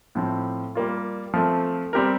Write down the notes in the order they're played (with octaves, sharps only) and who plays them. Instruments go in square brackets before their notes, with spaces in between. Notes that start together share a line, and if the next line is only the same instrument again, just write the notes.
[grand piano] A2 F3 C4
G3 A#3 F4
F3 A3 C4
G3 C4 G4 A#4